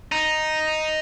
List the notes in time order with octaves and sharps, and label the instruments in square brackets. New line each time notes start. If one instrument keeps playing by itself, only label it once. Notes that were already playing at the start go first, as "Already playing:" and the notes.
[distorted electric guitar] D#4